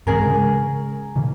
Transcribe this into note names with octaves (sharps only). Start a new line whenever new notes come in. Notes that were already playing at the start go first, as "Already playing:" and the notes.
G#2 E3 G#3 C#4 G#4 A#4
C#3 G#3
A#2 C#3 E3